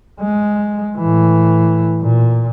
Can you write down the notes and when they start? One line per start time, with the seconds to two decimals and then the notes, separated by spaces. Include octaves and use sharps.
0.20 G#3
0.97 A2 E3
2.01 A#2